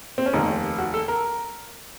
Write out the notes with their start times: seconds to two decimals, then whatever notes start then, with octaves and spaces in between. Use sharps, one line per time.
0.18 C4
0.26 C#4
0.33 F1 D#2 D#3 D#4
0.78 F#4
0.94 A4
1.08 A#4